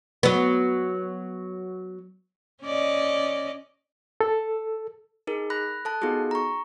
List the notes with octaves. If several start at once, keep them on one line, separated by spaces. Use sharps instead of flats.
F#3 B3
C#4 D5 D#5
A4
D#4 G#4 A#4
B5 F#6 A#6
A4 A5 F#6
B3 D#4 F4 F#4 G#4 A4
A#5 C#6